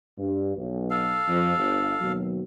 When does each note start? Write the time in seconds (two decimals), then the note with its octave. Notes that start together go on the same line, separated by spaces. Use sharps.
0.18 G2
0.56 B1
0.91 A4 F5
1.27 F2
1.57 G1
2.01 D#2 B2 F#3